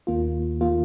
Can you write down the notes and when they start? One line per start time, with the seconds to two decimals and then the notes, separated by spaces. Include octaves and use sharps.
0.07 D#2 D#3 A#3 F4
0.61 D#3 A#3 F4